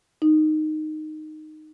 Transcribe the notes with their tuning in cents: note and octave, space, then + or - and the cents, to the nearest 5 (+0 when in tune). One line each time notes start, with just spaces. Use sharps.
D#4 -10